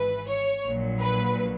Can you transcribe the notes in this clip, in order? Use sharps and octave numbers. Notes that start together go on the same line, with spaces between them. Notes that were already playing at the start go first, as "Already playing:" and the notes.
Already playing: G#1 G#2 E3 B4
C#5
A#1 A#2 F#3
B4